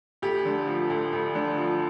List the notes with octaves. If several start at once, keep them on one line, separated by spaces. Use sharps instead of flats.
D2 G4
D3
F3
D2
D2
D3
F3